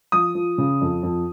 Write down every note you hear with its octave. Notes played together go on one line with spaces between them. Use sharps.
F3 D#6
F3
C#3
F2
F2